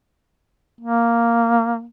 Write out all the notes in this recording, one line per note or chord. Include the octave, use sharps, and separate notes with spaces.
A#3